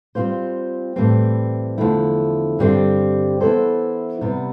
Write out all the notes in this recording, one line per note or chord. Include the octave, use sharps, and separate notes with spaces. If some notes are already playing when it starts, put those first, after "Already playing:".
G3 C4 F4 C5
A2 E3 G3 C4
E2 D3 F3 A3 E4
G2 D3 G3 C4 G4
E3 B3 E4 A4 C5
C3 G3 B3